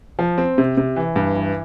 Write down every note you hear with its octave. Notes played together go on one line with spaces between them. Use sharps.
F3
C4
C3
C3
E3
G2
E3